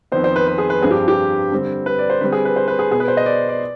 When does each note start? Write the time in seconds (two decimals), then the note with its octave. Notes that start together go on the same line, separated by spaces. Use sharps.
0.12 F2 D#3 B3 C5
0.24 C5
0.36 B4
0.48 B4
0.58 G#4
0.70 B4
0.81 G2 F3 C4 G#4
0.91 G4
1.08 G4
1.52 D3 G3 C4
1.86 B4
1.99 D5
2.10 C5
2.21 D3 G3 C4 B4
2.32 G#4
2.45 B4
2.56 C5
2.68 B4
2.79 G#4
2.91 B2 B3 G#4
3.00 B4
3.08 C5
3.17 D#5
3.26 D5
3.49 D5